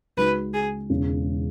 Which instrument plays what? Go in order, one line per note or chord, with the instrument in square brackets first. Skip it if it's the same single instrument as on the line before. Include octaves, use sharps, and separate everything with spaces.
[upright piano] C#2 C#3 G#3 D#4 F#4 [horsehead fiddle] B4
[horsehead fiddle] G#4
[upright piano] E1 E2 C#3